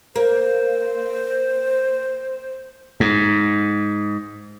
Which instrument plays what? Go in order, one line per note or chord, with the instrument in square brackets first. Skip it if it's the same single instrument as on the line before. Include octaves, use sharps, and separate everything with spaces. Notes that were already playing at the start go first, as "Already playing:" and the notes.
[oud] A#3 [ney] C5
[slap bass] G#2